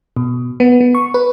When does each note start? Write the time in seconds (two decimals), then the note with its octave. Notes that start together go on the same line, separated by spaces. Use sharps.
0.17 B2
0.60 B3
0.81 B3
0.95 C#6
1.14 B4